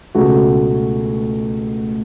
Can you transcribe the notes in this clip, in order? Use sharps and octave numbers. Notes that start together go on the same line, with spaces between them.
C#2 B2 A3 F#4